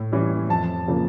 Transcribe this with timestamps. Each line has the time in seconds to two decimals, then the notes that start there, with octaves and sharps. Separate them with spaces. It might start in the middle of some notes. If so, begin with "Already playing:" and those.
Already playing: A2
0.12 E3 G3 C#4 E4
0.49 F2 A5
0.87 C#3 F3 A#3 C#4